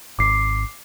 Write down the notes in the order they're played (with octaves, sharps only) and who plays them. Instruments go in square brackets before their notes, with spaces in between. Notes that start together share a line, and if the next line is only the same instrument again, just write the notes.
[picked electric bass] G#1 [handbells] D6 C7